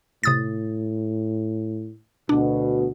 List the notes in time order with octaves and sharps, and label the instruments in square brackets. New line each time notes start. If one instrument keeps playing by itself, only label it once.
[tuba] A2 [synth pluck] C3 D#6 A6
[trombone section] D2 B2 [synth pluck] D4